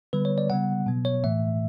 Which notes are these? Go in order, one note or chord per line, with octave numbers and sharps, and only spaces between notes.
D3 G3 B3 B4
C#5
D5
C#3 G3 B3 F#5
B2 F#3 B3
C#5
A2 E3 A3 E5